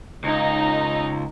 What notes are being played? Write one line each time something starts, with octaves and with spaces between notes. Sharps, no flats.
C#2 D#4